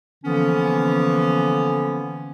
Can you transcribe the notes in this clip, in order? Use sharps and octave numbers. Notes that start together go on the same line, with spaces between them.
D3 E3 F3 A#3 B3 C#4